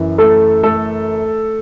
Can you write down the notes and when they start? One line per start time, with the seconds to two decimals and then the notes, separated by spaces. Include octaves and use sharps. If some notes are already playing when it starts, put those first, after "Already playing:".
Already playing: F#2 E3
0.18 A3 A4
0.63 A3 A4